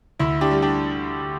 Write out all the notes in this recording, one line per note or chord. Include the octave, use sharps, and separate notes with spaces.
D2 E4
D4 G4
G3
D4 G4